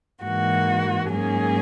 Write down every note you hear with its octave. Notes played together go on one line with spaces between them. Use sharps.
G#2 E3 A#3 F#4
G#2 F#3 A#3 C#4 G#4